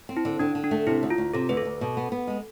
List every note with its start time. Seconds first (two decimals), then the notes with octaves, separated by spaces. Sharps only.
0.09 C4
0.17 E4
0.25 D3
0.39 D3 D4
0.55 D3
0.64 D4
0.71 A3
0.87 C3 E4
1.03 D2
1.10 F4
1.18 D2
1.34 C3 A4
1.49 D2 B4
1.57 A4
1.65 D2
1.81 B2
1.97 B3
2.12 B3
2.27 G#3